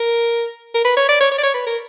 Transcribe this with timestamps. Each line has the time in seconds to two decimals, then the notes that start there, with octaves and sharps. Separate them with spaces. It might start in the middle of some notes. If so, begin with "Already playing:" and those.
Already playing: A#4
0.74 A#4
0.85 B4
0.97 C#5
1.09 D5
1.20 C#5
1.31 C#5
1.38 D5
1.43 C#5
1.54 B4
1.66 A#4